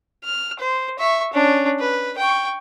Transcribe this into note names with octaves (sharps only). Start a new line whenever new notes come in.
F6
C5
E5 C#6
C#4 D4
B4
G5 C#6